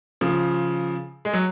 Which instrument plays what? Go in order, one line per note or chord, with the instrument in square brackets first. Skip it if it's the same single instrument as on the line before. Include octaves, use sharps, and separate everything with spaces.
[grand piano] C#3 F3
G#3
F#3